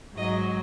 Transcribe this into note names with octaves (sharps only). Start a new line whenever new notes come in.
G#2 F#3 D#5